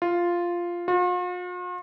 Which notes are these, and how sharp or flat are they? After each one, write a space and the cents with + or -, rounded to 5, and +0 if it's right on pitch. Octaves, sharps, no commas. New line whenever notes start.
F4 -5
F4 +45